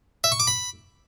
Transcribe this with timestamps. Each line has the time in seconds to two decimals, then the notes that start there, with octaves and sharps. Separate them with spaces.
0.24 E5
0.32 C#6
0.40 D6
0.47 B5